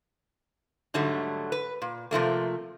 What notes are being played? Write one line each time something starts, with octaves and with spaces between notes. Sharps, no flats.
G#2 D3 F#3 G3 A3
B4
A#2
C3 F3 A3 A#3